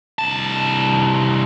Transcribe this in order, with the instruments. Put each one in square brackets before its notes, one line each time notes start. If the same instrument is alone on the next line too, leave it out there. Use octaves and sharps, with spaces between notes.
[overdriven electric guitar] C2 A5